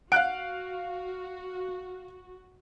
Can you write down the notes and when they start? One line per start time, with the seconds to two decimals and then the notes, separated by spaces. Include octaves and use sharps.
0.12 F#4 F5 F#5 F#6 D7